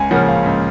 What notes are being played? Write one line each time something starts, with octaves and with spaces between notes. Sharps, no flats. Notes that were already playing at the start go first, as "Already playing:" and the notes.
Already playing: C#2 G#5
C#3 F3 A#3 C#4 F#5
F5
C#2